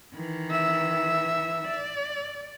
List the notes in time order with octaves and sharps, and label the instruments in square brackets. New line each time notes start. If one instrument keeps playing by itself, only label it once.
[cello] D#3 E3
[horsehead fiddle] E5
[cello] D5